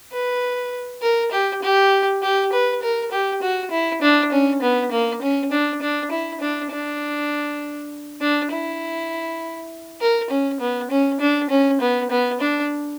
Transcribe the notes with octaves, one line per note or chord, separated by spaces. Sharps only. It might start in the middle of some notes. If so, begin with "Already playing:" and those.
B4
A#4
G4
G4
G4
B4
A#4
G4
F#4
E4
D4
C#4
B3
A#3
C#4
D4
D4
E4
D4
D4
D4
E4
A#4
C#4
B3
C#4
D4
C#4
B3
B3
D4